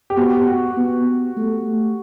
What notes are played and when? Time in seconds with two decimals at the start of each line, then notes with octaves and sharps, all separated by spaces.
0.10 G4
0.17 B3 F#4
0.47 F#4
0.77 B3
1.37 A3